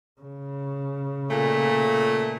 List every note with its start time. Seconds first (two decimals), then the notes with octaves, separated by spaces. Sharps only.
0.22 C#3
1.31 A#2 A3